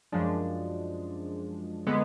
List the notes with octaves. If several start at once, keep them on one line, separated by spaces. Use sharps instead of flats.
F#2 F3 G#3 D4
D3 G#3 B3